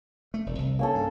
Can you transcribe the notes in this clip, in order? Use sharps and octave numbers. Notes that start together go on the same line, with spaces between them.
A3
E1
C2
A#3 C#4 A4
G2